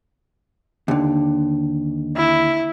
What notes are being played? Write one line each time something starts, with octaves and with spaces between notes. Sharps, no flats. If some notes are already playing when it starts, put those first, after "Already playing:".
D#2 D3
E4